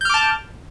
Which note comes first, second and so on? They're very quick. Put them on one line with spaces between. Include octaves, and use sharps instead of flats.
G6 F6 D6 A5